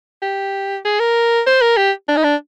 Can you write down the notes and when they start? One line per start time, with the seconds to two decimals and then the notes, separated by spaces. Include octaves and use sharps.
0.22 G4
0.85 G#4
0.99 A#4
1.47 C5
1.61 A#4
1.77 G4
2.08 D4
2.17 D#4
2.24 D4